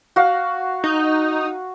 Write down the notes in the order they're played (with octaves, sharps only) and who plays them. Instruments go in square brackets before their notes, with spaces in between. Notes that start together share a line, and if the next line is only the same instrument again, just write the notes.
[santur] F#4 F5
[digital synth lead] D#4